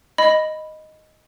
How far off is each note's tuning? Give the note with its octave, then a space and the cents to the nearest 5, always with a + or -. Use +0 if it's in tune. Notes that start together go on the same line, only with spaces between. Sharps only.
D#5 +0 B5 +0